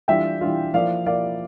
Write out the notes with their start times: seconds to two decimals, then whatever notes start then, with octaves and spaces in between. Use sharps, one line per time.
0.08 E3 G3 D4 F4 E5 G5
0.41 E3 G3 D4 F4
0.74 F3 A#3 E4 D5 F5
1.06 F3 A#3 E4 D5 F5